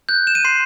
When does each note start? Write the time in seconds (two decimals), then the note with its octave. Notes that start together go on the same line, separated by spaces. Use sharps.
0.09 F#6 G6
0.27 E7
0.35 D#7
0.45 C6 C7